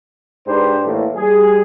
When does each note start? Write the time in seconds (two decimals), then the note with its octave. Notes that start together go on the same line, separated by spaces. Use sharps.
0.47 G#2 D4 G4 B4 C5
0.85 A2 E3 A3 A#3
1.15 G3 G#4